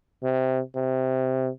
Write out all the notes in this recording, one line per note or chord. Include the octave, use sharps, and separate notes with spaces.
C3
C3